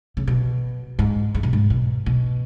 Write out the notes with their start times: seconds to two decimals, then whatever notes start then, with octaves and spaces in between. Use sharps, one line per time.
0.17 C#3
0.27 B2
0.99 G#2
1.35 G#2
1.43 B2
1.53 G#2
1.70 B2
2.06 B2